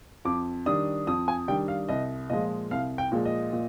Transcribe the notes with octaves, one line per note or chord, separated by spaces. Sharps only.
F2 D6
D#3 G3 D4 D#6
F2 D#6
G#5
D#3 G3 D4 G5
F5
C2 D#5
A#2 F3 G#3 D#5
C2 F5
G5
A#2 F3 G#3
D#5
A#2